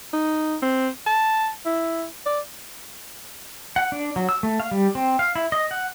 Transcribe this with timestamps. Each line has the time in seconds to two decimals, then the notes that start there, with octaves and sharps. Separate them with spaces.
0.13 D#4
0.62 C4
1.06 A5
1.66 E4
2.26 D5
3.76 F#5
3.92 D4
4.16 F#3
4.29 E6
4.43 A3
4.60 F5
4.71 G3
4.95 C4
5.19 F5
5.36 E4
5.52 D#5
5.71 F#5